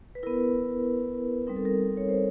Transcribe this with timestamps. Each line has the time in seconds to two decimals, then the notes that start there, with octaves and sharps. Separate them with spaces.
0.15 B4
0.23 B3 E4 A#4
1.47 G3 C4 D#4 A#4
1.56 A4
1.65 A#4
1.97 C#5
2.09 C5